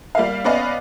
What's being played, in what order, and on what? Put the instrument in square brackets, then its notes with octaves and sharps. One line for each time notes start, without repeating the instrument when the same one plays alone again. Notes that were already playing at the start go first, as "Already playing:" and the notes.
[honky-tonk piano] G3 A#3 F5
B3 C#4 B4 D5 D#5 F5